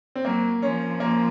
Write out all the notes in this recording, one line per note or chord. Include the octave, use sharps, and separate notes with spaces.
C4
F#3 A#3
F3 C#4
A#3